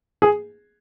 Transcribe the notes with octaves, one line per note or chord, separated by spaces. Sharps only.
G#4